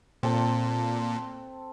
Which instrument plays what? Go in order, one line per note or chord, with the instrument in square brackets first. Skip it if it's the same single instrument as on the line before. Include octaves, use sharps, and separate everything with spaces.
[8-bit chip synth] A#2 [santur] C4 A4 A5